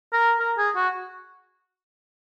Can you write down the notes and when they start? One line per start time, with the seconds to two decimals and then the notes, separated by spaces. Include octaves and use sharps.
0.13 A#4
0.40 A#4
0.58 G#4
0.76 F#4